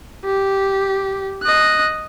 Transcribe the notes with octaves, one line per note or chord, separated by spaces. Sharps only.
G4
D#5 F#6